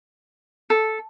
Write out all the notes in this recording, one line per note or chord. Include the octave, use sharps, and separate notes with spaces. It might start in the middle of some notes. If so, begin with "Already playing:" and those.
A4